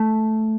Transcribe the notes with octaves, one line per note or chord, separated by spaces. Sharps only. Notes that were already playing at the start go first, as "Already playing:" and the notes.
Already playing: A3